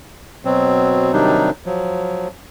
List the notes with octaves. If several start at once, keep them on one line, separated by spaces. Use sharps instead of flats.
B2 F#3 C4
C3 D#3 F#3 G3 D4 D#4
F3 F#3